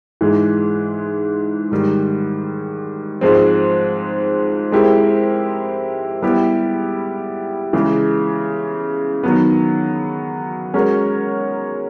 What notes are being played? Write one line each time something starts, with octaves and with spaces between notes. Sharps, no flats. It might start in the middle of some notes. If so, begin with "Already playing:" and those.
G#2 E3 G#3
G#2 D#3 G3
G#2 F3 G#3 C4
G#3 C4 E4 G4 A#4
G3 B3 E4 G4
C#3 E3 G#3
D#3 F#3 B3
G#3 C#4 F#4 A#4 C#5